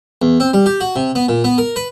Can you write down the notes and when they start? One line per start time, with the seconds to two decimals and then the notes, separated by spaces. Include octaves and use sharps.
0.22 E2
0.40 C4
0.53 G3
0.66 G4
0.81 F#4
0.96 C3
1.15 B3
1.28 A#2
1.44 B3
1.58 A#4
1.76 B4